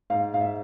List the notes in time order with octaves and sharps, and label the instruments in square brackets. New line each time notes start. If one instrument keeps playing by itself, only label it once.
[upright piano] G#2 F5
G#2 F5
E5